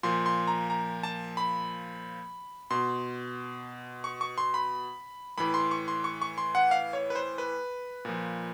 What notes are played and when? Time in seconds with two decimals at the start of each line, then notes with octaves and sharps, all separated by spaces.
0.03 A#2 F3 C6
0.26 C6
0.47 A#5
0.70 A#5
1.03 A5
1.37 B5
2.70 B2 C6
4.04 C#6
4.21 C#6
4.38 C6
4.54 B5
5.38 A2 E3 B5
5.54 C6
5.71 C#6
5.88 C6
6.04 C#6
6.22 C#6
6.38 C6
6.55 F#5
6.71 F5
6.93 C#5
7.10 B4
7.15 C5
7.38 B4
8.05 A#2 F3